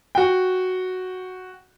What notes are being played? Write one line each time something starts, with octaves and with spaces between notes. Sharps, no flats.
F#4 G5